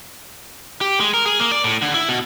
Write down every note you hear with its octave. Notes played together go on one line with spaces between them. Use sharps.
G4
G#3
A#4
G#4
A#3
D5
A2
D3
E4
B2